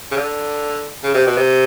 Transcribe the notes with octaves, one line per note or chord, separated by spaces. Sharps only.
C#3
D3
C#3
C3
B2
C3